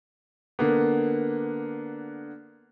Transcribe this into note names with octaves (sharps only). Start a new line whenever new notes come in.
D3 A#3 B3